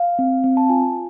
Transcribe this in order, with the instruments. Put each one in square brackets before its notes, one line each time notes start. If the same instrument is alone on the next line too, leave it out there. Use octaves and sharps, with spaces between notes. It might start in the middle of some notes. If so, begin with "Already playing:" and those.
Already playing: [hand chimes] F5
C4
C4
A5
F4 G#5